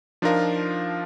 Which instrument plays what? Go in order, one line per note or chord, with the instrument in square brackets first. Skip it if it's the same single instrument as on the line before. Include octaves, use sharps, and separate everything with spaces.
[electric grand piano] F3 D4 D#4 F4 A#4 F5